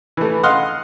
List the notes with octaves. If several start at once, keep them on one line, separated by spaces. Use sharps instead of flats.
E3 A3
D#5 F5 F#5 C6